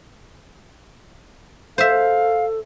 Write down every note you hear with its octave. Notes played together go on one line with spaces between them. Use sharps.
A4 C5 E5 F5